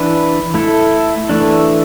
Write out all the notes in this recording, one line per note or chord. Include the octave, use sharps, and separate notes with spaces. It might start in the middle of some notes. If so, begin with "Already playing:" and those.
Already playing: E3 D4 B4
A3 E4 A4
E3 A3 D4